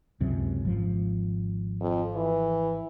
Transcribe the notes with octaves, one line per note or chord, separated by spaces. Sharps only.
C#2 F#2 C3
G#1 F3
F2
E3